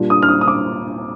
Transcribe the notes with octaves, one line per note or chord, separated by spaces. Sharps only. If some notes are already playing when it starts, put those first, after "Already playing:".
Already playing: A#2 G3 D4 F4
D#6
F6
D#6
D#6
D6